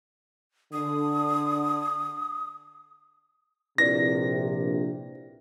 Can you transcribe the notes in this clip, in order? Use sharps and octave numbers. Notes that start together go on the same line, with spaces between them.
D3 D#6
A#1 C3 E4 B4 D5 A#6